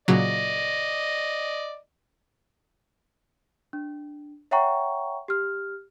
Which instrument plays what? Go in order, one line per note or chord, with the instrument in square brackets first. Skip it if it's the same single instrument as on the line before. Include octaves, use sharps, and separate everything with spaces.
[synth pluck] A#2 C#3 F#3 [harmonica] D5 D#5
[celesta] D4
C#5 E5 F#5 G5 A#5 C#6
G4 F6